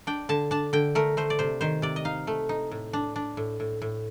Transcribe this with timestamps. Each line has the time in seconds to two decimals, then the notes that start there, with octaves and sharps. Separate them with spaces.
0.07 D4 G5
0.29 D3 A5
0.51 D4 A5
0.73 D3 G5
0.95 A3 A#4
1.17 A3 C5
1.30 D5
1.39 C3 C5
1.61 D#3 C5
1.82 C3 D5
1.96 D#5
2.05 D#4 F5
2.27 A3
2.49 D#4
2.71 A2
2.93 D4
3.16 D4
3.37 A2
3.60 A2
3.82 A2